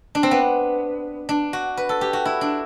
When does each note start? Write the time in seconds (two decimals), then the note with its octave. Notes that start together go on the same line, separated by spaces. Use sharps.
0.15 D4
0.23 C4
0.31 B3
1.29 D4
1.53 F#4
1.77 B4
1.89 A4
2.01 G4
2.13 F#4
2.25 E4
2.41 D4